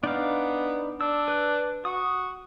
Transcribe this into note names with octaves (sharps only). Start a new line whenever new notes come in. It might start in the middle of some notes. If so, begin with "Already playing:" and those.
B3 D4 D#4 F5
D4 E6
B4
F#4 D#6